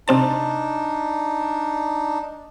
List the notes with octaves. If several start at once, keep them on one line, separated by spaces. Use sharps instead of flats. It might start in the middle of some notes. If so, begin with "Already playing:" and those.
C3 C4 D4 D#4 A5